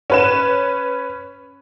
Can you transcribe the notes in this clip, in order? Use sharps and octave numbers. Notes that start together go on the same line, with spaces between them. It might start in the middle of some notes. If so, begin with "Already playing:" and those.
C#4 B4 E7